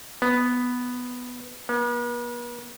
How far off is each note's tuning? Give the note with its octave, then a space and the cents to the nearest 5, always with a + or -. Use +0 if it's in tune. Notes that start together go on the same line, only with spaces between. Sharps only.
B3 +0
B3 -45